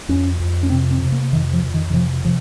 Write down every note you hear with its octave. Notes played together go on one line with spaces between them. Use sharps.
F2 C#4
F2
C#4
C3 C4
C4
C3
A#3
F2 D#3
F3
F2
D#3
D#3
C3 F3
C3 F3